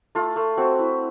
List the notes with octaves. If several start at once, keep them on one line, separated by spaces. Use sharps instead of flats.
A3 F4
A3
C4 F#4
E4